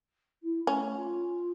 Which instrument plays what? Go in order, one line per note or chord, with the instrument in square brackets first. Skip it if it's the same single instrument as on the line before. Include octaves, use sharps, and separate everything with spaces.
[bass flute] E4
[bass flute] A3 [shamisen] C#4
[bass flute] F4